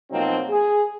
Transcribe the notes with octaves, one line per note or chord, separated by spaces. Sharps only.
B2 F3 F#3 A#3 C4 D#4
G#4